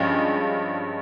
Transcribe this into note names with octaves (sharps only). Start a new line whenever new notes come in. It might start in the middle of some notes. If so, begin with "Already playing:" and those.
Already playing: G2 F3 G#3 C#4